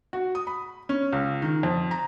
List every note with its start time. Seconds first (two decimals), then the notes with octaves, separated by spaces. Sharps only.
0.13 F#4
0.35 D#6
0.47 B5
0.89 C#4
1.13 C#2
1.42 D#3
1.63 F2
1.91 A#5